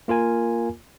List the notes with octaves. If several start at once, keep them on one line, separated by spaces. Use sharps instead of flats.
A#3 F4 A#4 G#5